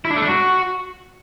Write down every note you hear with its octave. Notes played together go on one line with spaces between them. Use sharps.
E4
D4
A3
D4
F#4